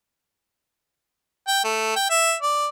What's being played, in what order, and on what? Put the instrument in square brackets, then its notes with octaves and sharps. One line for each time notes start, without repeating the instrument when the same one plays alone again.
[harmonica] G5
A3
G5
E5
D5